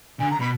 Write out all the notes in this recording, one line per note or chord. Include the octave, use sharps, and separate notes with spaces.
D3 G#5
A#5
B2 B5